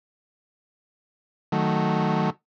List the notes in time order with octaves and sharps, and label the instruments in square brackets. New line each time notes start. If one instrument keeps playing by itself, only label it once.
[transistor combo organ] D#3 F#3 A3